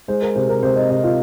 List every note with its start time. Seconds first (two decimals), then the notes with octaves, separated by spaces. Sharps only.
0.08 G#3 C5
0.22 A#4
0.35 C3 C5
0.49 A#4
0.63 C3 C5
0.76 D#5
0.89 C3 D#5
1.04 F4